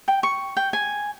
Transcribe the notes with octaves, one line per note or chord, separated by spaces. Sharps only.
G5
C#6
G5
G#5